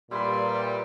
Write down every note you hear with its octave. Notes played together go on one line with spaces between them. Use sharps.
A#2 G3 E4 B4 C6